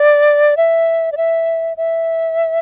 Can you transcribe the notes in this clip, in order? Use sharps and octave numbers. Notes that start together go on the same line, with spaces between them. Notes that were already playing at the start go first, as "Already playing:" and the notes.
Already playing: D5
E5
D5
E5
E5